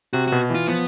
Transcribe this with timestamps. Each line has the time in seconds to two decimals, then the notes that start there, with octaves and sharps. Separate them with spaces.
0.13 C3 F#4
0.27 B2 F#4
0.50 E3 F4
0.67 F3 B3